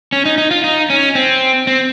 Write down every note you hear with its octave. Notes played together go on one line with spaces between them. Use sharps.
C#4
D#4
D#4
F4
D#4
C#4
C4
C4